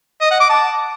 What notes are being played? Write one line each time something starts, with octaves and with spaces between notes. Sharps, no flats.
D#5
F#5
D6
A5